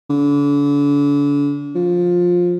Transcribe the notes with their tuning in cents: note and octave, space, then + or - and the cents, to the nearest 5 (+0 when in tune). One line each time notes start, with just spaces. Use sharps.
D3 -40
F3 +15